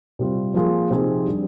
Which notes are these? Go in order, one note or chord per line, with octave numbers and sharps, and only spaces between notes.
C3 G3 C4 F4
F3 A#3 F4 G#4
C3 F3 C4 D#4 G#4
G3 D4 G4